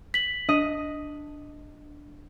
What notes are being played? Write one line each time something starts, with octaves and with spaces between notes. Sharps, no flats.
B6 F#7
D4 D#5